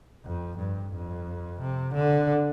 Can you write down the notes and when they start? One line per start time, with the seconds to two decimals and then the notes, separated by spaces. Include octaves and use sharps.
0.25 F2
0.59 G2
0.93 F2
1.61 C3
1.94 D3